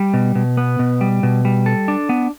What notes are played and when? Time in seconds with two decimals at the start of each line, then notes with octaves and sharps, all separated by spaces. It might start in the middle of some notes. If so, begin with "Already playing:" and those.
Already playing: G3
0.14 B2
0.35 B2
0.57 B3
0.79 B2
1.01 G3
1.23 B2
1.45 G3
1.66 A4
1.88 D4
2.09 B3